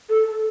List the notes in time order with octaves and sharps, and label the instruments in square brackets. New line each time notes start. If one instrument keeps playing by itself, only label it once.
[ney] A4